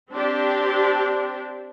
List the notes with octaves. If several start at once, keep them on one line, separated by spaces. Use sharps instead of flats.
C4 D4 G4